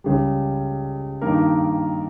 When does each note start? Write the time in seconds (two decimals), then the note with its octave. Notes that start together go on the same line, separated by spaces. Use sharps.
0.04 C#2 C#3 G3
1.22 G2 D#3 A#3 D#4 A#4